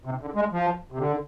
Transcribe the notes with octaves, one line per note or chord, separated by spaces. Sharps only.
C3
D3
G#3
F3
C3
D3